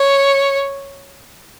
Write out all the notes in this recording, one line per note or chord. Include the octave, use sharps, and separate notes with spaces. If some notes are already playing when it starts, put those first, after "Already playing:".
Already playing: C#5